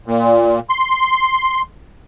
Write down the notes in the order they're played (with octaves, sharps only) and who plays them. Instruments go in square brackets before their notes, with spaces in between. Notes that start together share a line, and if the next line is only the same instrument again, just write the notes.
[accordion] A#2
C6